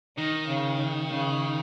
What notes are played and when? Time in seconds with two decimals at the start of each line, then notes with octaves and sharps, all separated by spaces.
0.17 D#3 D#4
0.49 C#3
1.11 C#3